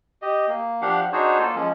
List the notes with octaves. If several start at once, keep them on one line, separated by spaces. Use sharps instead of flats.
G4 D#5
A#3
F3 D4 G4 F5 F#5
D4 D#4 F#4 G#4 C5 C#5
A#3 F4 A4
F3 G#3 C#4